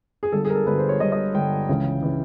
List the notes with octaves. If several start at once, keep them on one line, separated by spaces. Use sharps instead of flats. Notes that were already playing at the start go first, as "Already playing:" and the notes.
G#4
G1 G2 D3 A4
G#4
A#4
A4
G1 G2 D3 B4
C5
C#5
G1 G2 D3 D#5
D#5
G1 G2 D3 G5
C#2 C#3 E3
C#3 E3